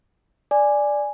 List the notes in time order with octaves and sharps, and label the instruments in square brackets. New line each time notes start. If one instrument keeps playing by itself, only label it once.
[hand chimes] D5 [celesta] G#5